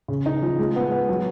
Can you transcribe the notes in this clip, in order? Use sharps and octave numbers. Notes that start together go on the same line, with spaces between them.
C#3
D#4
F3
G#3
B3
B3
F#3